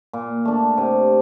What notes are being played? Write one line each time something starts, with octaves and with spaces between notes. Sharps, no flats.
A#2
A3 D4
C3